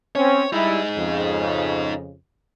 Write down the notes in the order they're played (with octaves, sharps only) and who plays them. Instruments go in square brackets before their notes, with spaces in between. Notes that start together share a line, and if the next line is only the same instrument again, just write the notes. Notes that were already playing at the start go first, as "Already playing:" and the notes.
[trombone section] C4 C#4 [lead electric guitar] C#5
[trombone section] G3 E4 [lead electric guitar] D#4 G#4
[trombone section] F2 C#3